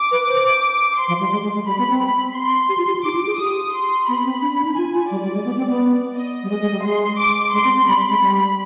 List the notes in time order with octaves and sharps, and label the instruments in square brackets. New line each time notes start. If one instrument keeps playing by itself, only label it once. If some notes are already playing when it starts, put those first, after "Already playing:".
Already playing: [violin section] D6
[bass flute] B4
C5
[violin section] C6
[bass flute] F3
G3
G#3
G#3
G#3
[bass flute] G3 [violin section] B5
[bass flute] B3
C4
[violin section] B5
C6
[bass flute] G4
F4
G4
F4
[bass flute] D#4 [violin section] D6
[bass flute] F4
G#4
[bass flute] G4 [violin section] D#6
[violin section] C6
[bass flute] B3 [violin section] B5
[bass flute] C4
D4
D4
D#4
[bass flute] F4 [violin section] G#5
[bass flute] F4
[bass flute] G3 [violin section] D5
[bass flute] G3
G#3
B3
C4
B3
[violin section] D#5
[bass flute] G3
[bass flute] G#3 [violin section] D#5
[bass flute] G#3
G3
[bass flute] G#3 [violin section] C6
[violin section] D6
[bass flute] G#3 [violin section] C6
[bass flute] C4
C4
[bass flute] G3 [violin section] B5
[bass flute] G#3
G3